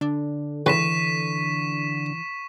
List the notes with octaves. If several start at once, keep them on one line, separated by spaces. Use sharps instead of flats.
D3 D4
C#2 E3 B4 C6 C#6 B6 E7